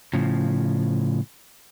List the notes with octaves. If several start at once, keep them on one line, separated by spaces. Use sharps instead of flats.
A2 C#3 F3